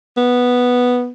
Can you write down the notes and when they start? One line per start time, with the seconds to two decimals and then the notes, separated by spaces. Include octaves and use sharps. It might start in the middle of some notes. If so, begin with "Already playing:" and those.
0.17 B3